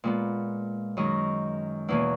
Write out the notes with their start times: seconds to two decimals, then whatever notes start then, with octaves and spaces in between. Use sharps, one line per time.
0.04 A#2 G#3 B3
0.97 F#2 D#3 G#3 C#4 D#5
1.88 E2 B2 A#3 C#4 E4